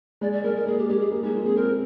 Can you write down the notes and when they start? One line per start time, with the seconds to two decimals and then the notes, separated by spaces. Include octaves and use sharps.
0.21 G#3 D5
0.32 D5
0.43 G#3 A#4
0.56 A#4
0.66 A#3 G#4
0.78 G4
0.89 G#3 G4
1.00 G#4
1.11 A#3
1.23 G#3 D#4
1.34 A#3 F4
1.45 C4 G#4
1.56 C4 A#4